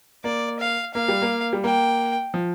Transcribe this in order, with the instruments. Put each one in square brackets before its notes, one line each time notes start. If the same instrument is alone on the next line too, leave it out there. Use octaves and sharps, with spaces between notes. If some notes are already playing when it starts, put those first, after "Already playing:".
[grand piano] A#3 [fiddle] D5
[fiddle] F5
[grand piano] A#3 [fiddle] F5
[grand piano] G3
A#3
G3
[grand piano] A#3 [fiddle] G5
[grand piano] F3